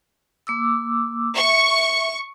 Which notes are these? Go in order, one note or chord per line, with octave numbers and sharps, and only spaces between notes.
A#3 D6 E6
E5 C#6